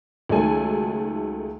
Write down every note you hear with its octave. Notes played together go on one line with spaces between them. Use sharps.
C#2 D#3 F#3 A3 A4 G#5